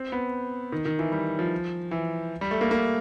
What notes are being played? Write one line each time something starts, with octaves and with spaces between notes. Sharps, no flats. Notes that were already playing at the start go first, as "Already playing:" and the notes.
Already playing: C4
B3
D#3
D#3
E3
G3
F3
E3
G3
A3
A#3
A#3